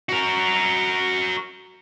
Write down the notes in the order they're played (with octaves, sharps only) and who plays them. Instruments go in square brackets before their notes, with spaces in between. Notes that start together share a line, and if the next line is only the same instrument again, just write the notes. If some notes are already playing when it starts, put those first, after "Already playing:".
[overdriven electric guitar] F#4 A#4